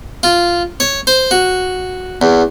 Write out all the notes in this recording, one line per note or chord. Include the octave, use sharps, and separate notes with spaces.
F4
C#5
C5
F#4
E2